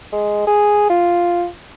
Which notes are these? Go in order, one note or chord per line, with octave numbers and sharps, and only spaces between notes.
G#3
G#4
F4